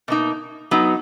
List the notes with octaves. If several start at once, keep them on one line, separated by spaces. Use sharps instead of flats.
B2 A#3 D#4
F#3 B3 D#4